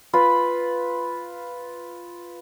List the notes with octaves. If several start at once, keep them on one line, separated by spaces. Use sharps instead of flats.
F4 B4 B5